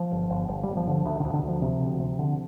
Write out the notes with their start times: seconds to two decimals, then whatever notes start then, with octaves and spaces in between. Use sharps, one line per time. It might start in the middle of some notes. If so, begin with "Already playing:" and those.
Already playing: F3
0.12 G1
0.30 G1
0.48 G1
0.63 G1 G3
0.77 F3
0.87 D3 F3
1.05 D2
1.20 D3
1.25 D2
1.33 D3
1.43 D2
1.48 F3
1.62 C3
1.81 D2
2.00 C3
2.19 D3